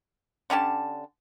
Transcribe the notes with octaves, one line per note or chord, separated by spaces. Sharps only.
D3 C#4 G4 A5